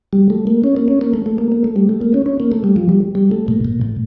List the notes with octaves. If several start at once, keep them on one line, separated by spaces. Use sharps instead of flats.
G3
A3
A#3
C#4
A#3
C#4
A#3
A3
A3
A#3
A#3
A3
G3
A3
A#3
C#4
C#4
A#3
A3
G3
F3
G3
G3
A3
A#2
A#2
A2